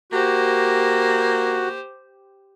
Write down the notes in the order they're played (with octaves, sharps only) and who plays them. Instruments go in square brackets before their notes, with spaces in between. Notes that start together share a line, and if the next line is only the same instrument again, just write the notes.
[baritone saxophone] A#3 [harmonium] F#4 [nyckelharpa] G4 C5